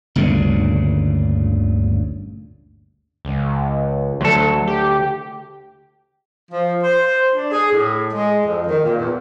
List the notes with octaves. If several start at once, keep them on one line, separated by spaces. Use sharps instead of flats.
G1 D2 A#2 C#3
C#2
D2 F#3 A4
G4
F3
C5
D4
G#4
A2
G#3
F2
D#3
A#2
E2